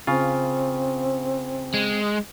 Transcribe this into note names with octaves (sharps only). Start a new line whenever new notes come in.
C#3 C4 F4
G#3